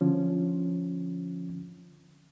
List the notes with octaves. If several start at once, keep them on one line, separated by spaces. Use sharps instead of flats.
D3 F3 C#4